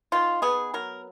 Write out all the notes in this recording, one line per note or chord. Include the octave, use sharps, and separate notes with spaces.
D#3 F4
B3 G#4
F#3 A#4